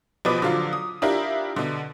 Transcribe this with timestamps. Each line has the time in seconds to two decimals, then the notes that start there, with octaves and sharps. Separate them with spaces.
0.25 A1 B2 F3 B4 D6 D#6
0.42 D3 F3 F#3 F4
0.73 D#6
1.02 D4 E4 F4 G4 A#4
1.56 B2 D3